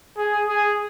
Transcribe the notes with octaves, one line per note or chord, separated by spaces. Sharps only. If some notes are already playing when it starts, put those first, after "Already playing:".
G#4
G#4